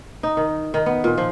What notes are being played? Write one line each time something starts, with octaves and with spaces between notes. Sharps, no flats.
D#4
D#3
D#3
B3
A#2
F3